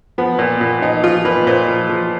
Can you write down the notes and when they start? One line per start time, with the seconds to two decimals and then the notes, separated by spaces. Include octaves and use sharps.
0.18 F3 B3
0.39 A#2
0.61 A#2
0.82 F3 D#4
1.04 F3 F4
1.25 A#2 B4
1.47 A#2 C5
1.68 F3
1.89 F3